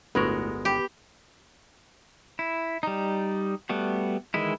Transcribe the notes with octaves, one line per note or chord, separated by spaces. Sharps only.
G1 D2 A2 G#3 B3 A#4 C#6
G4 G5 B5
E4
G3 D#4
G3 A3 B3 F#4
D#3 E3 G#3 E4